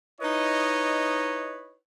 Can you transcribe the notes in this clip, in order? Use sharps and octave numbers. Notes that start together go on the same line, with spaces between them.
D#4 E4 B4 C#5 D#5